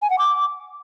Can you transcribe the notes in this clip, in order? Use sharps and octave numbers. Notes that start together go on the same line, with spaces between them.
G#5
F#5
D6